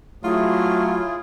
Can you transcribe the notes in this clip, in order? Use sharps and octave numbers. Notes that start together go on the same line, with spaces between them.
F#3 A3 E4 F4 G#4